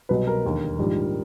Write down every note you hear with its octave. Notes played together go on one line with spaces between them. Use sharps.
C2 B2 F#3 B4
A#4
E1 D#2 D3
A#1 G#2 D#3 G3